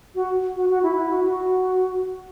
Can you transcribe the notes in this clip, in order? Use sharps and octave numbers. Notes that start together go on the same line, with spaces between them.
F#4
F#4
F#4
E4
E4
F#4
F#4